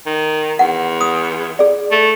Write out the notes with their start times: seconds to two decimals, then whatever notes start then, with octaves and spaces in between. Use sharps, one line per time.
0.06 D#3
0.59 E2 F#5
1.01 D#6
1.59 G#4 D5
1.91 A3